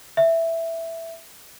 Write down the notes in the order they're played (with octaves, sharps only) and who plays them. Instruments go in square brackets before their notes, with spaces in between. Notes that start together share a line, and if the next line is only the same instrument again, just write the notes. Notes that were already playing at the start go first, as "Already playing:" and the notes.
[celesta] E5